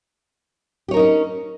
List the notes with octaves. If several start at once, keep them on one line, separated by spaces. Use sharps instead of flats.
C#4 D#4 G4 A#4 C#5